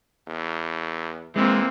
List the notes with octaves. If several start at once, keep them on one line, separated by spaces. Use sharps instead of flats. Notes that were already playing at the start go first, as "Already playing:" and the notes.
E2
E3 G#3 A#3 C4